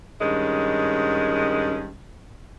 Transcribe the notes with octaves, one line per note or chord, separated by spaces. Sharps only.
G2 D#3 G#3 C#4